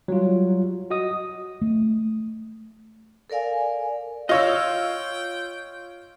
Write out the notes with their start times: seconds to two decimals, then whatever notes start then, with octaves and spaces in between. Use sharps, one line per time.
0.08 F#3 G3 F4
0.90 F#4 D#5 D#6
1.61 A3
3.30 A4 A#4 D5 F5 G#5
4.29 F4 C#5 D#5 G5 E6